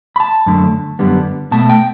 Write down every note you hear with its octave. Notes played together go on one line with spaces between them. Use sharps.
B5
A5
F#2 D3 A3
F#2 D3 G3 B3
B2 A3 A5
G5